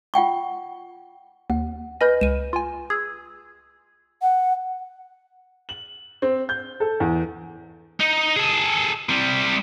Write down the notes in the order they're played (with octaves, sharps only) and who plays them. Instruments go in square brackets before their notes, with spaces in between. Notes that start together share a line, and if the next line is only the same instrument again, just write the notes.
[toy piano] F4 F#5 G5 C#6
[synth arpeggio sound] D#2 [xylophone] F#5
[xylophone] B4 D#5 A#6 [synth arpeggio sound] G#5 B5 G6
[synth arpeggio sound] C#2 [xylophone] D#7 E7
[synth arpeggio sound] F4 G#5
[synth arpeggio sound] G#4 [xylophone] E6 G#6
[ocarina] F#5
[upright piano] F#7
C4
G6
A4
E2
[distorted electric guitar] D#4
G#4 A4
C3 G3